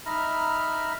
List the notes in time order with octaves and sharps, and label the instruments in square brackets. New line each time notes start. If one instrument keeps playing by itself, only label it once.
[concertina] D#4 E5 A#5 B5 F6